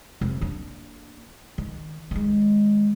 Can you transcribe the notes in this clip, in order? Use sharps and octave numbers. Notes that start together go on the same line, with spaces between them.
F1
A#3 D4
D#3
D#3 G#3